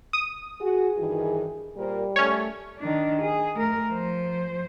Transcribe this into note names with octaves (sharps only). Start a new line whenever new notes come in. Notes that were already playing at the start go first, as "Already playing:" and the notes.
D#6
F#4 G#4
G2 D#3 E3
A#2 G3 A#4 C5
A3 C#4 C#5
D#3 D4
G#4
A3 A#4
F3 C5